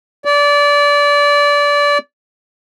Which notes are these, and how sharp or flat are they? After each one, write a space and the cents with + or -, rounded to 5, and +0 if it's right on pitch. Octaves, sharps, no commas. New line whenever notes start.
D5 -25